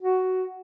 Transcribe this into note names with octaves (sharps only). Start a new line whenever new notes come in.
F#4